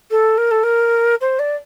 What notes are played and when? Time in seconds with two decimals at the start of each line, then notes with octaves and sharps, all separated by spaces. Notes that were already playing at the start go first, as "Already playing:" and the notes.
0.11 A4
0.38 A#4
0.51 A4
0.63 A#4
1.21 C5
1.39 D5